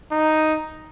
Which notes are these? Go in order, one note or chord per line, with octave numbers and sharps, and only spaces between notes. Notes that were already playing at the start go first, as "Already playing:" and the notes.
D#4